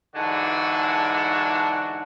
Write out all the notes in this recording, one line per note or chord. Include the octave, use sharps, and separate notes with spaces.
G#2 D3 E3 G#3 D4 F#4